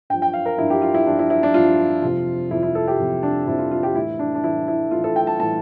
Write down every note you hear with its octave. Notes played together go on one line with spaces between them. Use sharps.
G2 F3 G5
G5
F5
A#4
G2 F3 E4
G4
F4
E4
G2 F3 D4
E4
E4
D4
G2 F3 F4
F2 C3 F3
F2 C3 F3 E4
E4
A4
G4
F2 C3 F3
D4
F2 C3 F3 E4
F4
F4
G4
A2 E3 E4
D4
D4
A2 E3 E4
E4
A2 E3 F4
A4
G5
A5
A2 E3 A5